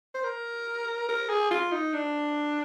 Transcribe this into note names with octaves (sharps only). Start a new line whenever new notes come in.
C5
A#4
A#4
G#4
F4
D#4
D4